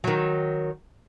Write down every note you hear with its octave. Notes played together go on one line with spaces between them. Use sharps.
D#3 F#3